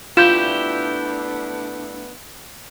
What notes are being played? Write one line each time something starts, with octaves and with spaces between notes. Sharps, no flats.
A3 B3 D4 E4 F4 G4 G6 E7